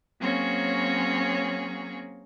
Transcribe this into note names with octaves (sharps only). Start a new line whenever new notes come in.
F#3 A#3 C4 C#4 G#4 C#5